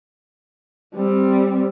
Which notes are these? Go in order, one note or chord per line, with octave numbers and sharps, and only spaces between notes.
G3 C4